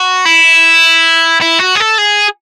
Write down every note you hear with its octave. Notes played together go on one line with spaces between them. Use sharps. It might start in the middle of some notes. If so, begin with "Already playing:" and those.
Already playing: F#4
E4
E4
F#4
G#4
A4
G#4